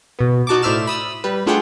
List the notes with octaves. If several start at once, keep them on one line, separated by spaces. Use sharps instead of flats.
B2 B3
D#4 F#4 A5 C#6 D6
A2 C5 D5 E5 F6 E7
B5 D#6 E6
G3 B4
A3 D4 F4 G#4 F#5 G5